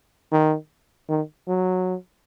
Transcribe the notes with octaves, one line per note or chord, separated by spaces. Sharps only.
D#3
D#3
F#3